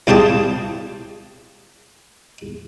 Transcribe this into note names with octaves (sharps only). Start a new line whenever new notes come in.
C2 F4 G4 G#4 A5